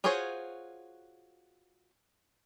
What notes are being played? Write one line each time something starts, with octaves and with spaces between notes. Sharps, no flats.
F4 F#4 G#4 C5 C#5